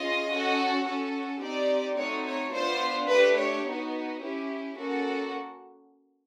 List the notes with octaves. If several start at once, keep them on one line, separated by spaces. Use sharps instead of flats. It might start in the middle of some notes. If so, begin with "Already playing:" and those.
Already playing: C#4 F4 G#4 D#5
C#4 F#4 A4
C#4 F#4 A4
C4 D#4 G4 D5
A3 C4 D#4 F#4 C#5
C#5
B3 D4 F4 C5
A3 D4 G4 B4
C#5
B3 D#4 F#4
C#4 E4 G4
A#3 C#4 F#4 A4